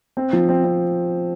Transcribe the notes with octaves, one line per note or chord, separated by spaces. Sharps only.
C4
F3
C4
C4